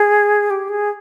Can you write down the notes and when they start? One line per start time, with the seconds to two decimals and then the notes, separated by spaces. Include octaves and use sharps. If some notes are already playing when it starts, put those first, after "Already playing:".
Already playing: G#4
0.50 G4
0.69 G#4